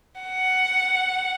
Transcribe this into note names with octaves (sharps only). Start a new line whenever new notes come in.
F#5